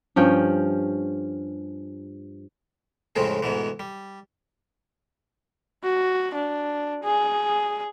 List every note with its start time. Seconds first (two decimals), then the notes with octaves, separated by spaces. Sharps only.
0.16 G2 F3 C#4 G5
3.16 F2 A2 C#3 G#3 C4
3.43 D2 G#2 B2 E3
3.80 G3
5.84 F#4
6.35 D4
7.04 G#4